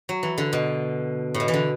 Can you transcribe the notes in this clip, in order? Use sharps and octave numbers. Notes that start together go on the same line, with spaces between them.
F#3
E3
D3
B2
A2
B2
E3
D3